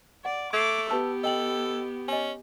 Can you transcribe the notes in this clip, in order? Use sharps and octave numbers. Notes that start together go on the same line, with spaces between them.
D5 F#5
A3 D6 G#6 C7
B3 G4 B4 A5 E6
A4 D#5 G5 F#7
C#4 D#5 G#5